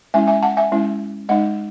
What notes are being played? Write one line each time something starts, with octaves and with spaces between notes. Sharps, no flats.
G#3 C#4 E4 E5 G#5
E5 G#5
F#5 A5
E5 G#5
G#3 C#4 E4
G#3 D#4 D#5 F#5